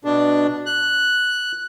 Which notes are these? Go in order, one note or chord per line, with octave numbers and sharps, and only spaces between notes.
B2 D4
F#6